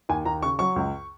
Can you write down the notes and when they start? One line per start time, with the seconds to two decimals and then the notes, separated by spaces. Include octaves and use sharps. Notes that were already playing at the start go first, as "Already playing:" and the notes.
0.09 D#2 G#5
0.25 D#2 A#5
0.42 C#3 C#6
0.59 F#3 C#6
0.76 C#2